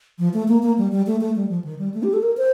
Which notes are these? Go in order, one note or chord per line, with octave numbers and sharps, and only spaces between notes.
F3
A3
A#3
A#3
G3
G3
A3
A3
G3
F3
D#3
G3
A3
G4
A4
A#4
C5